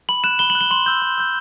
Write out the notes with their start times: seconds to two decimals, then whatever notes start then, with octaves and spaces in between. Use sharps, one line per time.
0.09 B5 F#7
0.24 F#6 E7
0.39 B5 G7
0.50 F#7
0.55 F#6
0.61 G7
0.71 C6 F#7
0.86 E6 G6
1.02 C6
1.18 E6 G6